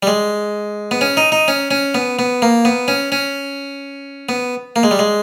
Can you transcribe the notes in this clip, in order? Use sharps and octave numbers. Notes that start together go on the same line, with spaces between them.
G3
G#3
B3
C#4
D#4
D#4
C#4
C#4
B3
B3
A#3
B3
C#4
C#4
B3
A#3
G#3
G3
G#3